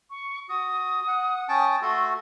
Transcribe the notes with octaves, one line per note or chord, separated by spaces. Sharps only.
C#6
F#4 D#6
F#5
C#4 G5 A5 D#6
A3 F#4 A4 C6